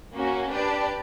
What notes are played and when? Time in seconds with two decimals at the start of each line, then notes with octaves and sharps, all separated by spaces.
0.14 A#3 C#4 F#4
0.50 D4 G4 B4 D5